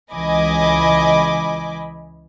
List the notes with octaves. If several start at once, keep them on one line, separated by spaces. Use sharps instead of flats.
C#2 E3 D#5 G#5 B5 D6